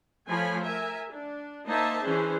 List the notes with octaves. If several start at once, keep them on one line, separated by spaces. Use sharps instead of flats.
F3 A3 C#5 G#5 B5
A#4 E5 G#5
D4
A#3 D#4 C5 D#5 E5 A5
E3 C#4 D4 G#4 C5